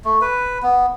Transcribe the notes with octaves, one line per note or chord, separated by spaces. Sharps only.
A3
B4
B3